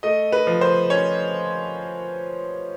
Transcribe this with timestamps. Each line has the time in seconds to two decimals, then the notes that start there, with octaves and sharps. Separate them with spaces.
0.03 A3 D#5
0.32 B4
0.47 F3
0.61 C5
0.90 C#4 C#5